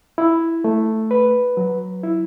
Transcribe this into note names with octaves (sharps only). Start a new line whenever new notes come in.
E4
A3
B4
F#3
E4